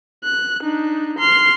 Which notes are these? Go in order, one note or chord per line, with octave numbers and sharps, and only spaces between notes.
F#6
D4 D#4
C6 F6